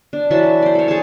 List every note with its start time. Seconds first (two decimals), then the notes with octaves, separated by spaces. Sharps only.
0.13 D4
0.30 E3 F#3 E5 A5
0.62 C5 D5
0.75 A4 C#5
0.88 G#4 A5